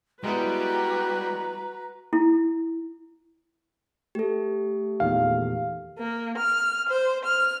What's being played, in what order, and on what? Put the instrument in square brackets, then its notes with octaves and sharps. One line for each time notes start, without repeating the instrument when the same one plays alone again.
[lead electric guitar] G3 [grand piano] G#3 B3 E4 [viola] F#4 B4 [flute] A#5
[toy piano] E4
[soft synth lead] A3 [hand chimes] G4 A4
[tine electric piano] E2 A#2 D#3 [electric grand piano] F5
[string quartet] A#3
F6
C5
F6